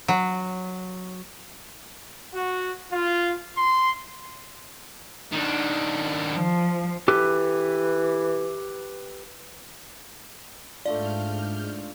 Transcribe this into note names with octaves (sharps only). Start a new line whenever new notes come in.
F#3
F#4
F4
C6
D#3 D4
F3
E3 G4 A4 B4
G#2 A3 D4 F4 D5 F6 G6